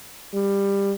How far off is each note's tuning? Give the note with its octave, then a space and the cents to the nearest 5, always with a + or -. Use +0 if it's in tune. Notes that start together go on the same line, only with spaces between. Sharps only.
G3 +15